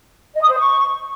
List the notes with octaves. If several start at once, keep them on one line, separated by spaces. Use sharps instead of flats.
D#5
D#6
C5
C#6